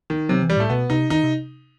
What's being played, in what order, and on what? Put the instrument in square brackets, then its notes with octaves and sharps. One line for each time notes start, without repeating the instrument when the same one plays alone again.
[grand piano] D#3
[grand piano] C3 [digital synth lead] F#3
[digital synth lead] E3
[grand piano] G3
[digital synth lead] A2 [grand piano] A3
[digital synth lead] B2 [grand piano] B3
[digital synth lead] C3 [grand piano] D#4
[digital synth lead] D#3 [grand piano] D#4
[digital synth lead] C3